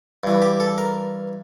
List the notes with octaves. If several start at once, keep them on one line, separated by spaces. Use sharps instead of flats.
G2 E3
G4
A4
A#4